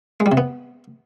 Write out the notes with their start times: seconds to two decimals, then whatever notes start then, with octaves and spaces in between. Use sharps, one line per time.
0.20 G#3
0.26 G3
0.32 C3
0.37 B3